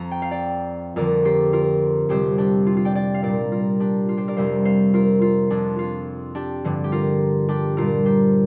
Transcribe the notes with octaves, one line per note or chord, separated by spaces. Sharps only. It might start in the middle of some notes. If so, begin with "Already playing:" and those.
Already playing: F2 F3 A#5
G5
F5
D5 G5
F2 D3 F3 A#4 D5
G4 C5
F4 A#4
F2 C3 G3 G4 C5
D4 G4
F4
F4
D5 G5
D5 G5
F5
A#2 G3 A#4 D5
F4 A#4
D4 G4
F4
G4 C5
A#4 D5
F2 C3 G3 C5 F5
C5 F5
F4 A#4
F4
F2 F3 D4
F4
D4 G4
G2 D3 F3
G4
F4 A#4
D4 G4
A#2 G3 F4 A#4
G4 C5